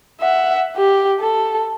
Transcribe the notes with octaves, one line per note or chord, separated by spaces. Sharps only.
E5 F#5
G4
A4